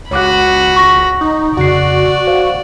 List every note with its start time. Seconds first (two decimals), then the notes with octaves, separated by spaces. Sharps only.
0.11 C#2 F#4 C#5 B5 D6 F#6
0.76 C#6 A#6
1.21 D#4
1.57 F2 C#3 F#4 D5 C7
2.27 C5 F5